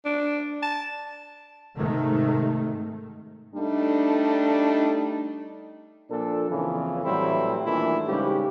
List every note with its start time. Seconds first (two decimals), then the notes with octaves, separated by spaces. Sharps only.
0.05 D4
0.62 A5
1.77 G#2 C3 D#3 A3
3.55 G3 A3 D4 D#4
6.11 A#2 F3 D4 A4
6.50 F2 A#2 C#3 E3
7.04 A2 E3 F#3 G3 C4 E4
7.65 A#2 D#3 E3 A3 D4 E4
8.07 G#2 C#3 G3 G4